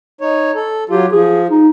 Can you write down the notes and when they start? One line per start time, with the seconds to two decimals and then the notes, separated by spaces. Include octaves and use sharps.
0.21 D#4 C#5
0.55 A4
0.90 F#3 F4 G4
1.12 F3 G#4
1.50 D#4